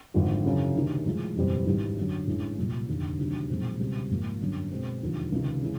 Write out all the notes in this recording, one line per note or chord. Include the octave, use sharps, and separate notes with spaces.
G#1 G2 D3 F3
F#2 C#3 E3
D2 C3 D#3
A2 F3 G#3
F#1 E2 B2 G3 C4
G#1 G#2 E3 G3
F#2 D3 F#3
A1 G2 E3 G#3 C#4
C2 A#2 F#3
F1 D#2 D3
D2 C3 D#3 F#3
B1 A#2 F3 G#3 C4
C#2 B2 G3 C4
G#1 G#2 F3 A#3
G1 F#2 D3
B2 G#3 C4
E1 D#2 D3 F3
C#2 C3 D#3
C#3 E3 G#3